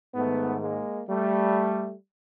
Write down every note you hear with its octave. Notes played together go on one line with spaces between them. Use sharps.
G#2 D#3 A3 B3
G#3 A#3
G3 A3